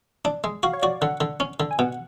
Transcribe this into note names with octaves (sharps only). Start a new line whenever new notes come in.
D4
G#3
F#4 F5
C#5
F#4 D5
D3 F#5
D3
C#4
D3
G#5
B2 F#5